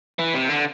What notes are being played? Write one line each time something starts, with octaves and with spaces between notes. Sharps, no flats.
E3
C3
D3